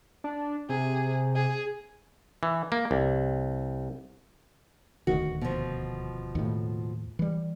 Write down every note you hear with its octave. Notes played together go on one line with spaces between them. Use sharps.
D4
C3 G#4
G#4
E3
A#3
C2
D#1 D2 D#3 F#4
B2 F3
D#2 A2
E3 G3